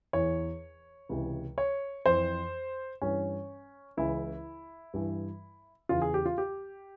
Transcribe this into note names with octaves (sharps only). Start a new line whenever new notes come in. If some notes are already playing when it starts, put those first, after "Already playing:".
E2 E3 C#5
C#2 C3 E3
C#5
F2 E3 C5
G2 E3 C#4
C#2 C#3 E3 E4
G2 E3
E2 C#3 E3 F4
G#4
G4
F4
G4